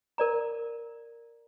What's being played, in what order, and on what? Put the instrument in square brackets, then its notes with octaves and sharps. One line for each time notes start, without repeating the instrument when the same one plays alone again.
[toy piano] A#4 D5 A#5